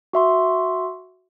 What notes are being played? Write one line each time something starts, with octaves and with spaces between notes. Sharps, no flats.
F#4 E5 C6